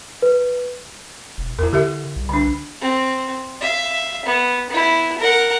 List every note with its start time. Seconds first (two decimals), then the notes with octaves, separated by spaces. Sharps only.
0.22 B4
1.38 E1
1.59 E2 E4 A#4
1.73 D3 G4 A#4 E5
2.16 C2
2.29 D3 D4
2.81 C4
3.61 E5 F5
4.25 B3
4.70 B3 E4
5.19 A#4 F#5